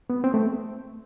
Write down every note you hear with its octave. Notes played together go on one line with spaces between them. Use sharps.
B3
C4
A3